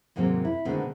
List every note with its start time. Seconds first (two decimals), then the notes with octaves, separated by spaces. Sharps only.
0.16 D#2 G#2 C3 F#3 A#3 C4
0.45 E4
0.65 B2 D3 D#3 G#3 A3 C4